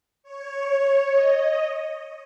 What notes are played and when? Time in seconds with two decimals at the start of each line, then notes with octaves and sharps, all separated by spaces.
0.23 C#5
1.12 D#5